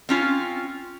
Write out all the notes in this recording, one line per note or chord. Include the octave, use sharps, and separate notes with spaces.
C4 C#4 F4